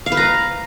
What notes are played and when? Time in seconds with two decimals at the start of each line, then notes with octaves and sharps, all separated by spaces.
0.06 F5
0.12 B4
0.17 A#5